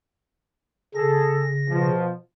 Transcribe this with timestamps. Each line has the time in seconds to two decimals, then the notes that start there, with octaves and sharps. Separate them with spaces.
0.95 C#3 G#4 A4 A#6
1.69 B2 F3